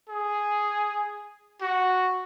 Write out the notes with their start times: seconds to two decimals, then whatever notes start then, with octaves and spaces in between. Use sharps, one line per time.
0.09 G#4
1.61 F#4